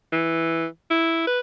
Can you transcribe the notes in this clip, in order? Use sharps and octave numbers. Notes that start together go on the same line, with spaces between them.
E3
E4
B4